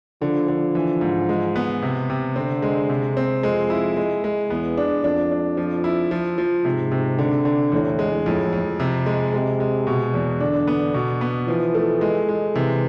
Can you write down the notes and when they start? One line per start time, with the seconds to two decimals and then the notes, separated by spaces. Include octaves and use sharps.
0.22 D3 F3
0.48 D3
0.75 E3
1.01 G#2
1.29 G#3
1.56 B3
1.82 C3
2.10 C3
2.36 D3 C4
2.62 G#3
2.89 C3
3.17 C4
3.43 F2 G#3
3.70 E4
3.97 G#3
4.24 G#3
4.50 E2 B3
4.77 D4
5.04 F2 D4
5.31 D4
5.57 F3
5.84 E4
6.11 F3
6.38 F3
6.64 G#2 C3
6.92 C3
7.19 D3
7.45 D3
7.72 E2 A2
7.99 G#3
8.26 F2 A2
8.53 F2
8.80 C3
9.06 G#3
9.34 C3 G#3
9.60 G#3
9.87 B2
10.14 E2
10.40 D3 D4
10.67 B3
10.94 B2
11.21 B3
11.48 E3 F3
11.75 A3
12.01 G#3
12.29 G#3
12.55 C3 E3